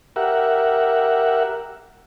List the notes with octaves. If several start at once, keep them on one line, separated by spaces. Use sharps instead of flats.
G4 A#4 E5 F#5